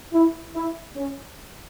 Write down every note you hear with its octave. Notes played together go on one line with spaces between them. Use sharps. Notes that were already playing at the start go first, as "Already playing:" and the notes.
E4
E4
C#4